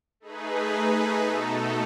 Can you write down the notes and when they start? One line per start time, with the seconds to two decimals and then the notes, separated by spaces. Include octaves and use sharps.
0.20 A3 D#4 G#4 B4
1.21 B2 A3 D#4 A4